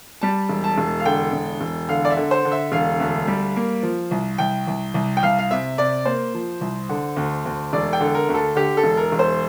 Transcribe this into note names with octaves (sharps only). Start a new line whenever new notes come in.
G3 A5
E1
A5
E1
F5
D3 G5
E1
E1
D3 F5
D5
E5
D3
C5
D3
E5
E1 F5
D2
G3
A#3
F3
C2
C2 G5
C2
C2
G5
C2 F5
F5
C3 E5
C3 D5
A#3 C5
F3
C2
D3
D2
D2
E1 D5
G5
D3
A#4
D2
A4
D3 G4
A4
E1
A#4
E1
C5